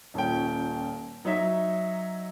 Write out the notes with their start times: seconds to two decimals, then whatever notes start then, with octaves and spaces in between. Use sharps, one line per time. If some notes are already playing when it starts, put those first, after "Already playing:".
0.14 D#1 A#2 C#4 G5
1.25 F#3 D#4 C#5 E5